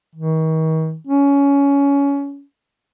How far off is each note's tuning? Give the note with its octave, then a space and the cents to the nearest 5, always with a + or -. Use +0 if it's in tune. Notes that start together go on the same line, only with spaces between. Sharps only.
D#3 +40
C#4 +20